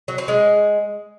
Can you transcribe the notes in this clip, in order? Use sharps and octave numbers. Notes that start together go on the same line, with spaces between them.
F#3
C4
G#3